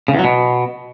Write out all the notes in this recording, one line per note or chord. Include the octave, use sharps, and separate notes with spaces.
C#3
E2
F#3
B2